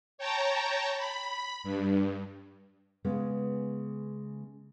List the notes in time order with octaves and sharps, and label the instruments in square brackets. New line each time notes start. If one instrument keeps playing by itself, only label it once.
[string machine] C#5 G5 A5 A#5
B5
G2
[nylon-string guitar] C#3 G#3 B3